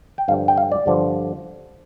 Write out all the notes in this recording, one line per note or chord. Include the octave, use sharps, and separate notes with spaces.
G5
G2 D3 F3 F5
G5
F5
D5
G2 D3 F3